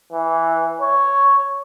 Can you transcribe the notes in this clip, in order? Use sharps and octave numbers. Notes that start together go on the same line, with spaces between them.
E3
C#5